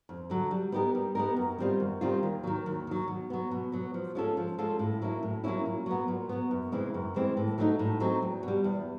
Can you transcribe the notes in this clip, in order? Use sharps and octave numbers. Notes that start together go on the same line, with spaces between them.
F2
D3 F#3
G3
B3 D#4 G4 A#4
G3
B3 D#4 G4 A#4
F#2
D#3 G3 C4 F4
F#2
D#3 G3 C4 F4
D#2
D#3 F#3
D#2
D#3 F#3
B2
F#3 B3
B2
F#3 B3
F3
G#3 C#4 F4 A4
F3
G#3 C#4 F4 A4
A2
F#3 A#3 C#4 E4
A2
F#3 A#3 C#4 E4
A#2
F#3 B3
A#2
F#3 B3
F#2
C#3 E3 G#3 C4
F#2
C#3 E3 G#3 C4
A2
F#3 A3 C4 D#4
A2
F#3 A3 C4 D#4
E2
B2
G3
E2